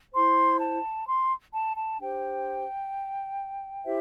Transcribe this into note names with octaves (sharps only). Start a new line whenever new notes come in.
E4 C5 C6
A5
C6
A5
A5
D4 G4 C5 G5
E4 G4 C5 E5